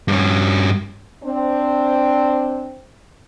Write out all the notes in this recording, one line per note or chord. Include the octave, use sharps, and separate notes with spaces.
G2 C#4
C4 D4 C5